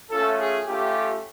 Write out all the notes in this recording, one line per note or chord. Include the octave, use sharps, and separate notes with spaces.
A3 C#4 F4 A4
G#4
A3 C#4 F4 G4